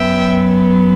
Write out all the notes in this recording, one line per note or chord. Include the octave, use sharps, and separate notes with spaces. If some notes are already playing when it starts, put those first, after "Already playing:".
Already playing: F#2 F#3 B3 E5 G5